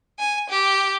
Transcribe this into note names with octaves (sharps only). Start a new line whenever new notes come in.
G#5
G4